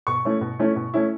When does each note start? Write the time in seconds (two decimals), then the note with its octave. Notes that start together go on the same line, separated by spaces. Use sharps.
0.07 B2 C#6
0.25 A3 C#4 E4
0.41 B2
0.59 A3 C#4 E4
0.76 B2
0.94 A3 C#4 E4